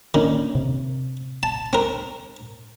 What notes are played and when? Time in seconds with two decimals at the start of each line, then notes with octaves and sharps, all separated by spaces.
0.14 D#3 A#3 C#4 D4
0.55 C3
1.43 A5
1.73 C4 A#4